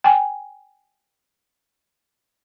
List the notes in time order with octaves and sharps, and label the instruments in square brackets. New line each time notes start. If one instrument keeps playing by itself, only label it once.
[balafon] G5 G#5